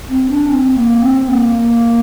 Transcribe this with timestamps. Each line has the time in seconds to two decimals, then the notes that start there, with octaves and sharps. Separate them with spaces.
0.09 C4
0.29 D4
0.50 C4
0.76 A#3
1.02 C4
1.29 A#3